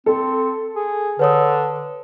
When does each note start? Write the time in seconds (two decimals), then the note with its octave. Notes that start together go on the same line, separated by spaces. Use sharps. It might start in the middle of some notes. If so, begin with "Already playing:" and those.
0.06 C4 A4
0.75 G#4
1.19 D3 B4 C#5 D#6